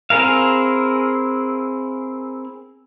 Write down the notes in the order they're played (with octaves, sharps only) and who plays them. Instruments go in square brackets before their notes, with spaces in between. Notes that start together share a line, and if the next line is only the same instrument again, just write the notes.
[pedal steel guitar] C4 E4 G#4 A#4 F5